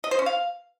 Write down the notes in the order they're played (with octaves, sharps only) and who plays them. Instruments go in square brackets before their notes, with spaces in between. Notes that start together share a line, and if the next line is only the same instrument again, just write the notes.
[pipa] D#5
C5
C#4
F5